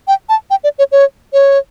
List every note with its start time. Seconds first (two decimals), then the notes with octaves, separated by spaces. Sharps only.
0.08 G5
0.29 A5
0.50 G5
0.64 D5
0.79 C#5
0.92 C#5
1.33 C#5